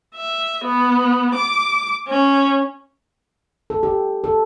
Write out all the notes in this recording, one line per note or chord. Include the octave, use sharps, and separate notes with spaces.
E5
B3
D6
C#4
A4
G4
A4